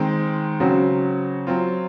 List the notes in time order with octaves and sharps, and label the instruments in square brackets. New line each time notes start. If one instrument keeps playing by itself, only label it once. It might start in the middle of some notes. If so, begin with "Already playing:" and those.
Already playing: [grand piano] D#3 G#3 C4
C#3 F#3 C4 F#4
F#3 C4 F4